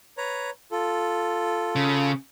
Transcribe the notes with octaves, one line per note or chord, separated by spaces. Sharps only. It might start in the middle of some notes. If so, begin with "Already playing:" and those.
B4 C#5 A#5
F4 A4
C#3